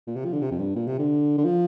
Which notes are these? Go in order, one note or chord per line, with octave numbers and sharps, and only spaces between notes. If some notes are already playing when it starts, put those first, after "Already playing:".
A#2
C3
F3
D3
C3
F2
G2
A#2
C3
D3
D3
F3